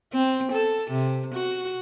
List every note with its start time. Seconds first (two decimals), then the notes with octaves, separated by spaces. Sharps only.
0.13 C4
0.52 A4
0.91 C3
1.35 F#4